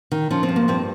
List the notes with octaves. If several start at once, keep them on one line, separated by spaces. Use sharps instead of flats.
D#3
F3 C#4
C4
G2
A#3
G2 C4